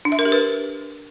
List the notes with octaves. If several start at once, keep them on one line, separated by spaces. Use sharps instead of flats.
D4
E5
A#4
G4
B4